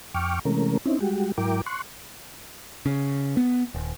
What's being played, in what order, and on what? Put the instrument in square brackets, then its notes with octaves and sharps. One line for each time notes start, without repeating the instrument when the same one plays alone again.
[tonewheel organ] F2 G5 C#6 D6 F6
C3 E3 G#3 A3 C#4 A#4
C4 C#4 D#4 E4
G3 G#3 F#4 G4
G#2 F#3 E4 A#4 G5 D6
C6 C#6 F#6
[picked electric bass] C#3
B3
D#1